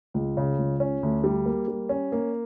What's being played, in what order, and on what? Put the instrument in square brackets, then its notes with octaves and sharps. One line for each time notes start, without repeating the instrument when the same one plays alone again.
[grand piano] C#2
C#3
C#2
C#4
D2
G3
A#3
G3
C#4
A#3